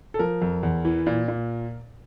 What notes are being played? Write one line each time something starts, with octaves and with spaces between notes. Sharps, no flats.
A4
F3 A#4
F2
E2
E3
A#2
A#2